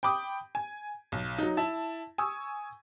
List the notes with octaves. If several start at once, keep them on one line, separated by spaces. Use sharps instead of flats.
G5 B5 D6 D#6
G#5
B1
F#3 D#4
E4 A5
G#5 C#6 D#6 E6